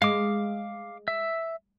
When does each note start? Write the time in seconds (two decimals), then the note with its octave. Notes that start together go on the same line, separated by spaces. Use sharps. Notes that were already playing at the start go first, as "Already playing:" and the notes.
0.02 G#3 F5 D6
1.08 E5